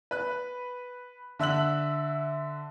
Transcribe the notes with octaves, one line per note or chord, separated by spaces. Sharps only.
B4 F#6
D3 E5 E6 F#6 F#7